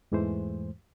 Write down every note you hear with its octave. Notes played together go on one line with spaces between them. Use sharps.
E2 G#2 E3 G#3 A3 C5